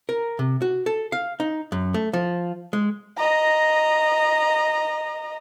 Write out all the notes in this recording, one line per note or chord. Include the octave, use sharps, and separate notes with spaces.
A#4
C3
F#4
A4
F5
D#4
F#2
A3
F3
G#3
D#5 A#5